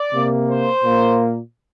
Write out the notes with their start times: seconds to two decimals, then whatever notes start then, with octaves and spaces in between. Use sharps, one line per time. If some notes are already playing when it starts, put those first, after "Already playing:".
Already playing: D5
0.12 C3 A#3
0.48 C5
0.82 A#2 A#3